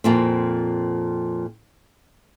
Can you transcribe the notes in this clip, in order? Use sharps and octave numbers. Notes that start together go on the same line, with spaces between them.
F2 A#2 C4